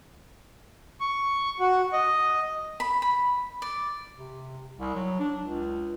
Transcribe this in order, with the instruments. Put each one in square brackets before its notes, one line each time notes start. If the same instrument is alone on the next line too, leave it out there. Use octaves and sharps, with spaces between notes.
[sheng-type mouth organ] C#6
F#4
D#5
[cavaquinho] B5
B5
D5
[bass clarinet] C3
C2
F#3
D4
C#2